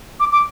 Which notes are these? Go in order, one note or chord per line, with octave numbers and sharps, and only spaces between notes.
D6
D6